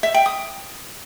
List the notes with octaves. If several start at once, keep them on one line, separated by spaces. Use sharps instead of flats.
E5
G5
D#6